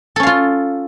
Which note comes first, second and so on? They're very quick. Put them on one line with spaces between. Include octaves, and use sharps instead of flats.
A4 C#4 F5 F4